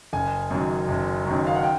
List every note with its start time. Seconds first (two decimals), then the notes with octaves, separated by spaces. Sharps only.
0.13 F#1 G#5
0.51 F#2 D#3 F#3
0.88 F#1
1.26 F#2 D#3 F#3
1.47 F5
1.56 F#5
1.63 G5